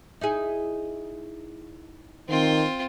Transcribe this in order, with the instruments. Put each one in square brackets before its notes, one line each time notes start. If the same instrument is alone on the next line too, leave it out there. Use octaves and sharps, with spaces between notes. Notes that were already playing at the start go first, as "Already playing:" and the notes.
[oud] D#4 E4 G#4
[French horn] D#3 [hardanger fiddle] C4 F4